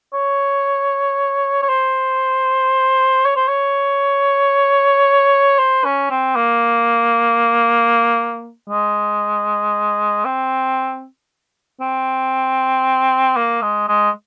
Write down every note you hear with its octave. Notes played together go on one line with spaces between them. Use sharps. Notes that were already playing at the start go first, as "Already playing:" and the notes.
C#5
C#5
C5
C#5
C5
C#5
C5
C#4
C4
A#3
G#3
C4
C4
A#3
G#3
G#3